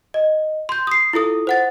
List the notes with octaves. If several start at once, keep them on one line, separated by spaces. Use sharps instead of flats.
D#5
C6 G6
D#6 C7
E4 F4 A4 D#6
C5 F#5 A6